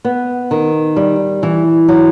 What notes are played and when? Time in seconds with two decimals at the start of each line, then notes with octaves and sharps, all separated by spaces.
0.05 B3
0.51 D#3
0.96 G3
1.43 E3
1.88 F#3